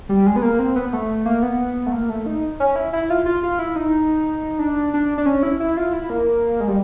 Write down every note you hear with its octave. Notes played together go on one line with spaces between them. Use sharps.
G3
G#3
B3
A#3
C4
B3
A3
A#3
B3
A3
A#3
A3
D#4
C#4
E4
E4
F4
F4
F4
E4
D#4
D4
D4
D4
C#4
E4
E4
F4
E4
A#3
G#3
G3